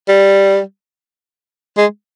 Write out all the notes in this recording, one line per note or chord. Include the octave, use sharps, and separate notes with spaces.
G3
G#3